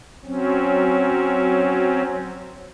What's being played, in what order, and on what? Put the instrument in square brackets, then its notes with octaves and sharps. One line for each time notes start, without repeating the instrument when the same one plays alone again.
[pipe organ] F#3 C4 C#4